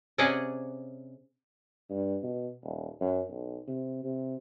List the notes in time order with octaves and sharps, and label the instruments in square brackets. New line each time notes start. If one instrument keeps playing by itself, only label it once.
[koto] C3 C#4 G#4 D5 D#5 F#5
[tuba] G2
B2
D#1
F#2
B1
C3
C3